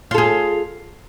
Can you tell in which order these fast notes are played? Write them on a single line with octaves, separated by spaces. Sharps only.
F4 A4 G#4